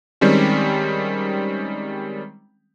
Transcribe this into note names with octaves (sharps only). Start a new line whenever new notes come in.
D#3 G3 G#3 C4 C#4